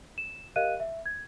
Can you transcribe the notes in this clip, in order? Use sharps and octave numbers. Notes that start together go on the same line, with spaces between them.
E7
G4 A#4 D#5 F5 F#6 D#7
E5
G#6